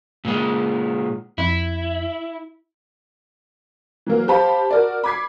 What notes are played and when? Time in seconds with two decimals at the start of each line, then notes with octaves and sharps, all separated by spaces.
0.25 A#2 G#3
1.38 F2 E4
4.06 E3 F#3 A#3
4.28 G4 C5 F5 A5 B5
4.71 F#4 A#4 D5
5.04 B5 D6 G#6 B6 C7